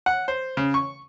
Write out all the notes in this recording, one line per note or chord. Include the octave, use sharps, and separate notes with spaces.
F#5
C5
C#3
C#6